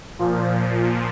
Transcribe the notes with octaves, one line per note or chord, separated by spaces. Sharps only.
A#2 F3